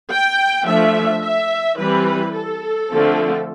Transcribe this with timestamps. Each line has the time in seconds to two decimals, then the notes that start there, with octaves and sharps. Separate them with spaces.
0.11 G5
0.66 F3 A3 D4 E5
1.22 E5
1.78 E3 G3 C4 B4
2.33 A4
2.90 D3 F3 A3 C4